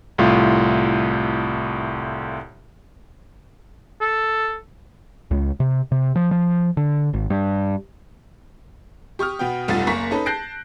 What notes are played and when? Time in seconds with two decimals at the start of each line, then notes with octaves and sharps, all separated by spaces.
0.18 C2 A2 F4
4.01 A4
5.31 C#2
5.60 C3
5.92 C3
6.16 F3
6.31 F3
6.77 D3
7.13 G#1
7.30 G2
9.19 G4 C#6 D#6 F6
9.39 B2 B3 G5
9.68 F1 B1 G2 B3 F4 A6
9.87 F#1 A#3 A#5 C#6 B6
10.11 C#4 D#4 A4 B4
10.26 A5 F#6 G6 A#6 C7 D7